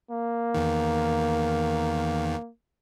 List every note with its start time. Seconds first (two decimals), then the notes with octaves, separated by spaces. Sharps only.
0.11 A#3
0.55 E2 D#3